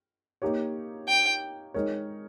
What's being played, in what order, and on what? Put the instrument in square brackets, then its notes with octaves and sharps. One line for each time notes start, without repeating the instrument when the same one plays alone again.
[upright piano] A#3 D#4 G4 C#5
[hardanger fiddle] G5
[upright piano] G#3 D#4 A#4 C#5